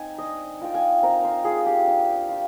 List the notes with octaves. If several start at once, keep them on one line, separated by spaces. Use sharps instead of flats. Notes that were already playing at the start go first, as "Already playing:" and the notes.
Already playing: C4 D#4 G#5
D4 D#5
F4 G5
G#5
C4 A#4
C5
F4 G#4
G4
D4
F4